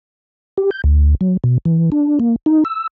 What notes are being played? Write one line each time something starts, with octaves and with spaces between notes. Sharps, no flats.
G4
G6
D2
F#3
B2
E3
D4
A#3
D#4
E6